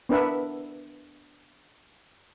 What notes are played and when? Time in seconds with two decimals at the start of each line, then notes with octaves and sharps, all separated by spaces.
0.09 B3 D4 A#4 B4 E5 F#5